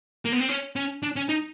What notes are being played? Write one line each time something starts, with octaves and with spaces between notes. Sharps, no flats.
A#3
B3
C4
C#4
C#4
D4
C#4
D#4